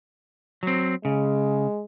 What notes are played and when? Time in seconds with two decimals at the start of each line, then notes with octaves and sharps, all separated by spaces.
0.63 F#3 C4
1.05 C#3 G#3